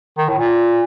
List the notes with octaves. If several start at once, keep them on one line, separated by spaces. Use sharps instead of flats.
D#3
A2
A#2